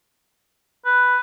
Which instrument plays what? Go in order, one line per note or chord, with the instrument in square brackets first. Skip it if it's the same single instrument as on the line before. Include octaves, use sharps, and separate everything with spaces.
[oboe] B4